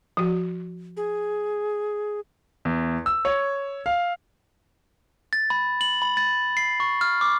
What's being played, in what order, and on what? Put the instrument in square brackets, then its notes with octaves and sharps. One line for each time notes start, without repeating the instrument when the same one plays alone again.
[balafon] F3 F#4
[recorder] G#4
[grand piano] E2
E6
C#5
F5
[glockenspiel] A6
B5
F#7
B5
A6
C7
C#6
F6
D6